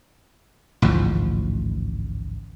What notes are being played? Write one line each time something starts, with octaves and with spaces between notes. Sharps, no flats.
A1 D2 G#2 F3